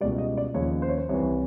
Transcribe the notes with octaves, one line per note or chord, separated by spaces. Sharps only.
C#2 B2 G3 D5
D#5
D5
D#2 C#3 F3 C#5
C5
C#5
C5
C2 C3 E3 C#5